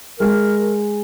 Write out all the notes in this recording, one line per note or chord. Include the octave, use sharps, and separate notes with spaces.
G#3 A#4